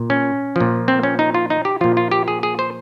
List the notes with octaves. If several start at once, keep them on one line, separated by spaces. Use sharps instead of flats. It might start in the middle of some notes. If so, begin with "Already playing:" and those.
Already playing: A#2
C#4
A#2 F3
C4
C#4
D#4
F4
D#4
G4
A#2 F3 F4
F4
G4
G#4
G#4
C5